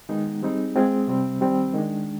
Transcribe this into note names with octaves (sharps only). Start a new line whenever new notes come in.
D#3 G#3 B3 D#4
G3 C4 D#4 G#4
G#3 C4 F4 G#4
C3 G3 C4
D#3 G3 C4
D#3 G#3 D4